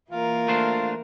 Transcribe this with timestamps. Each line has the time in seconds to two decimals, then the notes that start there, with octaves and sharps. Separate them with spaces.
0.11 E3 A#3 F4 A#4
0.48 A3 D4 C5